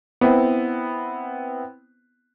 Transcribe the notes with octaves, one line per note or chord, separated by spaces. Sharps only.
B3 C4 E4